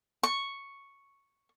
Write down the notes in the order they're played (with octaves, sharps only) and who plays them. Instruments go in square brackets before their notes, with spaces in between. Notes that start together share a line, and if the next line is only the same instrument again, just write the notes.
[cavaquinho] C#6